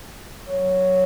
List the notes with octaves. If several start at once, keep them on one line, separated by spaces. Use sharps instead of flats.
F#3